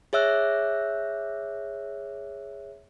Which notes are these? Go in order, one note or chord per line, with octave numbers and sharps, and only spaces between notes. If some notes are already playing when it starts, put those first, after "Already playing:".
G#4 C#5 E5 E6 F#6